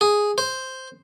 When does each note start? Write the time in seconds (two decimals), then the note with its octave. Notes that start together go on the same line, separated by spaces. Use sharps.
0.01 G#4
0.38 C5